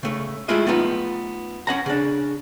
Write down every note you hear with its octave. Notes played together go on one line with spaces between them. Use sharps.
C#3 A3
G#3 A3 E4 F4 D#5
A3 B3 D#4 F4
C#4 F#5 A#5
C#3 D4